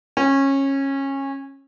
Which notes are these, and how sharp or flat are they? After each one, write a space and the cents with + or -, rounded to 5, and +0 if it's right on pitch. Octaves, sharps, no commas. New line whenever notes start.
C#4 -20